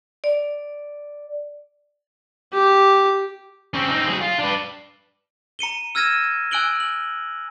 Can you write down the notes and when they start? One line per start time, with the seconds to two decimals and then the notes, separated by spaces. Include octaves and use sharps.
0.24 D5
2.53 G4
3.74 C4 C#4
3.89 C4 D#4
4.07 F#3 G#4
4.21 F4
4.39 D4 B4
5.59 A#5 C#7 D#7 G7
5.95 E6 F6 G#6 A#6 D#7 E7
6.51 G#5 E6 F#6 D7 F#7 G7
6.80 F#7